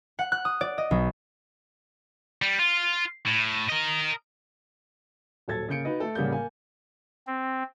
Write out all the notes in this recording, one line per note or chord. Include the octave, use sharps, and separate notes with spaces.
F#5
F#6
D#6
D5
D#5
B1
G3
F4
A2
A#4 D#5
D#1 F#3 A4 G#6 A6
C#3 A#3 G6 C#7 D7
D#4 F#4 B4 D#5
A3 A4
A1 C#3 G3 A#3 G6
A#3 G#5
C4